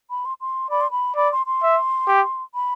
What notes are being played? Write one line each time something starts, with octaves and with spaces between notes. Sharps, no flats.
B5
C6
C6
D5 B5
C6
B5
D5 B5
C6
C6
E5
G4
B5